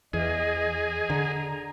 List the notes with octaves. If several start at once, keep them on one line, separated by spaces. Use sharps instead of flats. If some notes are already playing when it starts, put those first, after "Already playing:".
E2 G#4 D#5
D3 A#5